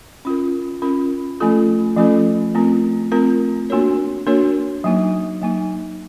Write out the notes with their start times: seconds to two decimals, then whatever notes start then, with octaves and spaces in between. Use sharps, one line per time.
0.25 C#4 F4 A#4
0.82 C#4 F4 A#4
1.40 F3 A3 C#4 F4 A4
1.97 F3 A3 C#4 F4 A4
2.55 A3 C4 F4 A#4
3.12 A3 C4 F4 A#4
3.70 A#3 D4 F#4 A#4 C#5
4.27 A#3 D4 F#4 A#4 C#5
4.84 F#3 A#3 D#4
5.41 F#3 A#3 D#4